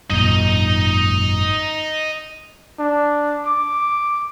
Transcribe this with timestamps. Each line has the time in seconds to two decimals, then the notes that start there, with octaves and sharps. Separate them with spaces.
0.10 G#1 F#2 A#2 D#4 D#5
2.79 D4
3.46 D6